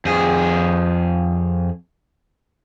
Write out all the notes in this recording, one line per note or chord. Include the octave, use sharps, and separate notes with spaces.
F2 G#4